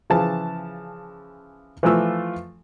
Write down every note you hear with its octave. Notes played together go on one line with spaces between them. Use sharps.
C#3 E3 F3 A5
E3 F3 A3 F4 E6